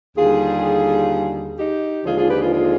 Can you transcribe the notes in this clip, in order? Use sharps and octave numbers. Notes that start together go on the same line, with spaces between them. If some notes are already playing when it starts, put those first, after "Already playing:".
D#2 D3 G3 F4 G#4
D#4 G4
D#2 D3 F3 G#3 F4 G#4
F4 G#4
G4 B4
F4 G#4
F4 G#4